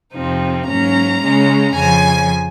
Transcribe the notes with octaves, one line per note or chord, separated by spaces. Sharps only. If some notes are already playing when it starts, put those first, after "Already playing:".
F2 C3 F3 C4 D#4
G#2 F#3 A#3 C#4 A#5
C#3 G#3 C#4
F2 C#3 F3 G#5